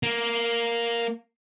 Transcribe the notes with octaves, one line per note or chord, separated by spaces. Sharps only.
A#3